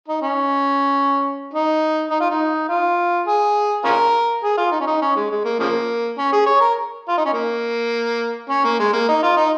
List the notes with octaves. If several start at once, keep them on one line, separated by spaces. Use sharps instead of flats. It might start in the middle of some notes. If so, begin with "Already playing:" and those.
D#4
C#4
D#4
D#4
F4
D#4
F4
G#4
C#4 F4 A#4
G#4
F4
D#4
C#4
D#4
C#4
G#3
G#3
A#3
C#3 F3 A#3
C#4
G#4
C#5
A#4
F4
D#4
C#4
A#3
C#4
A#3
G#3
A#3
D#4
F4
D#4